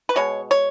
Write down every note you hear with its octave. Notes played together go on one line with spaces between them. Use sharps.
B4
B2 G#3 C#5
C#5